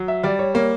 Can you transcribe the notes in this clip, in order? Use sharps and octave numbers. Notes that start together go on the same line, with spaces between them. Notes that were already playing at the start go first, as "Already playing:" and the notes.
Already playing: F#3
E5
G3 D5
C#5
A#3 C#5